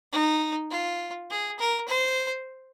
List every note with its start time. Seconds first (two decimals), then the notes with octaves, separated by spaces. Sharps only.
0.12 D#4
0.70 F4
1.30 G#4
1.59 A#4
1.88 C5